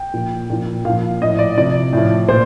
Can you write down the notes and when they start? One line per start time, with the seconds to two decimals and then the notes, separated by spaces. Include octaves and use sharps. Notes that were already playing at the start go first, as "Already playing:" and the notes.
Already playing: G5
0.14 A#2 F3
0.50 A#2 F3
0.85 A#2 F3 F5
1.22 A2 F3 D#5
1.39 D5
1.57 C3 F3 D5
1.93 A2 F3
2.29 A#2 C5